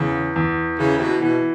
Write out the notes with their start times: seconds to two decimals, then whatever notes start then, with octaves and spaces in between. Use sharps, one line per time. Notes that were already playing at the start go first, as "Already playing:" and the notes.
Already playing: E2 C#3
0.36 E2
0.79 C#3 E3
0.97 C3
1.01 B2
1.22 B2 E3